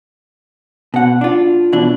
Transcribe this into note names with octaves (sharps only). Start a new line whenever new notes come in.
B2 F#5
D4 F4
B2 E3 D4